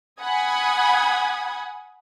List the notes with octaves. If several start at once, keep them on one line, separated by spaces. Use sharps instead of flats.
F#5 G#5 B5 D#6 G#6